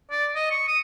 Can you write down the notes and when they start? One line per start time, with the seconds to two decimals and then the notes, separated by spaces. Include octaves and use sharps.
0.11 D5
0.35 D#5
0.51 C#6
0.68 D#6